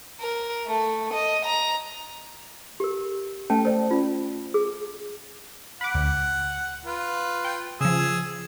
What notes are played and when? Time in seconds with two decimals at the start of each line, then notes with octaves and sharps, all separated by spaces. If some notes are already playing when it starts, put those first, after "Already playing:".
0.21 A#4
0.67 A3
1.14 D#5
1.46 A#5
2.80 G4 A#4
3.50 A3 C#4 A4 G5 A5
3.65 C5 D5
3.91 C#4 F4
4.54 G#4
5.81 F#5 B5 D6
5.94 D2
6.86 F4 B4
7.45 G5
7.81 C#3 F3 G#4 E6